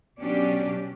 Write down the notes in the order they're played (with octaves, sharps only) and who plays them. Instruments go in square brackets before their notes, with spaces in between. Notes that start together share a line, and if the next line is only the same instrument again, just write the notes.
[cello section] B2 F#3 C#4 D4 G4 D5